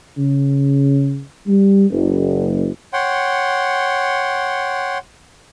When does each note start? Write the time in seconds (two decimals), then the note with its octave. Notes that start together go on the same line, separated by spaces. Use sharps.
0.18 C#3
1.47 G3
1.91 F#1
2.93 C#5 F#5 G5 C6